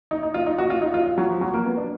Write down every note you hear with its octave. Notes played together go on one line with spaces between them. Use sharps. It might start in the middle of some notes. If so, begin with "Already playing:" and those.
D#4
D#4
F4
D#4
F#4
F4
D#4
F4
F4
F#3
F3
F#3
A#3
B3
D4